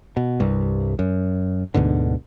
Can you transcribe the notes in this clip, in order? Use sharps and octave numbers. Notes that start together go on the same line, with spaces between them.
B2
C2 G2
F#2
D2 G#2 B2 D3